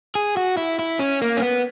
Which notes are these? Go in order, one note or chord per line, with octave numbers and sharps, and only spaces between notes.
G#4
F#4
E4
E4
C#4
A#3
C#4
B3